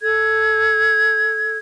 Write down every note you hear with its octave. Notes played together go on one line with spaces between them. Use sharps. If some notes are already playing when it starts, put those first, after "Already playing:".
A4 G#6